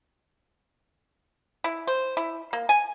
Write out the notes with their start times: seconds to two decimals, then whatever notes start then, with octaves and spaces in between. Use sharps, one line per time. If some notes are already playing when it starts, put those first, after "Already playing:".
1.64 E4
1.87 C5
2.17 E4
2.53 A#3
2.69 G#5